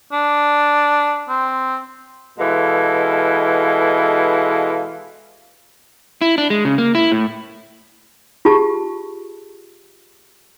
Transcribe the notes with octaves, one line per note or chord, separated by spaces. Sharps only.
D4
C4
B2 E3 G#3 A4 F5
E4
D4
G#3
C#3
A#3
E4
A2
F4 G4 G#4 A5 C#6